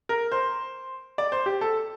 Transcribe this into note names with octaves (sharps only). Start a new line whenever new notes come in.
A#4
C5
D5
C5
G4
A4